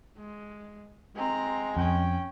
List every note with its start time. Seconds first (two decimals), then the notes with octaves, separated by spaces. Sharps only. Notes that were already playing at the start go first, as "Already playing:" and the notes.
0.17 G#3
1.16 G#3 C4 A#5
1.77 F2 C#4 G5